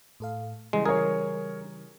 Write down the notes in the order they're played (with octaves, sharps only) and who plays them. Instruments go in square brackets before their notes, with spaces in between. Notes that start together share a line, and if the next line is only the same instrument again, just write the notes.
[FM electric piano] A2 A4 F5
[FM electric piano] C#3 E3 G3 [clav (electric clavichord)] G#3
[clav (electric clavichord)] G#4 [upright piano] A#4 C#5